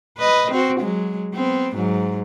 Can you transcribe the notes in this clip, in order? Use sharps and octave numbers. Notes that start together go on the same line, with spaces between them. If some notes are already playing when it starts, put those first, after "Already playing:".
B4 D#5
C4 F#4
F#3 G#3
B3 C4
G#2 F#3